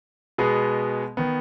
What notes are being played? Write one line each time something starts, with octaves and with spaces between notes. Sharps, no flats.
B2 G#3 B3 G#4
D#3 B3